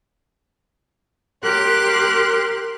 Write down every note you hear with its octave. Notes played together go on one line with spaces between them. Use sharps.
G4 A#4 C6 F#6